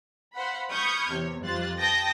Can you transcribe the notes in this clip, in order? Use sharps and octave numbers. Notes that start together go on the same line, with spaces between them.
C5 F5 F#5 B5
B5 C#6 D#6 F6 G6 G#6
E2 C3 C#5
F2 G3 F4 C5 F#6 A6
G5 A5 D#6 G6 A#6